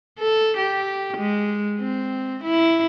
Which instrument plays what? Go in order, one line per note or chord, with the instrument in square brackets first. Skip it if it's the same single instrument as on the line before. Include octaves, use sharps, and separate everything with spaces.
[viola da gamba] A4
G4
G#3
C4
E4